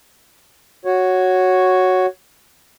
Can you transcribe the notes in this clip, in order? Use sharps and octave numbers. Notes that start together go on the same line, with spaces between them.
F#4 C#5